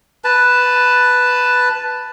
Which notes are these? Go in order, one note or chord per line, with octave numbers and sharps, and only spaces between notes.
B4 A5